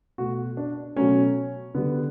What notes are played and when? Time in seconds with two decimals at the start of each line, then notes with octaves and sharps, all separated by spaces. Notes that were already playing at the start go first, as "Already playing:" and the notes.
0.18 B2 A3 F#4
0.57 D4
0.96 B2 F#3 A3 C#4
1.75 D3 G3 B3